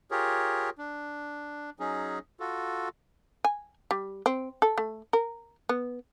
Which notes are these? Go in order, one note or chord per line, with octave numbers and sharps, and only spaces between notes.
F4 G4 G#4 A#4 C#5
D4
F#3 C#4 D#4 G#4
F4 F#4 A4
G#5
G3
C4
A4
A3
A#4
B3